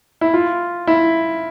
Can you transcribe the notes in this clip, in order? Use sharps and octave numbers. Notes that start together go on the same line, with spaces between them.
E4
F4
E4